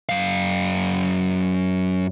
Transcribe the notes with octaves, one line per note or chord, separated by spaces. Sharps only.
F#2 F5